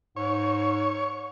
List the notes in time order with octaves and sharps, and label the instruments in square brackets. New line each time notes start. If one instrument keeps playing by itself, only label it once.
[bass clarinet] G#2 [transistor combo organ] C#5